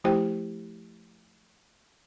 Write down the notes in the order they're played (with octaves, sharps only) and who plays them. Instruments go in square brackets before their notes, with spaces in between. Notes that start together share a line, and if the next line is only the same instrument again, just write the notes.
[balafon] F3 A3 E4 G4 C5 G5